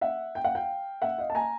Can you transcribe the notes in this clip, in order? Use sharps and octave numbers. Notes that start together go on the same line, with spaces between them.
E5 F#5
G5
F#5
F5 G5
E5 F#5
D#5 F5
A5
G#5 A#5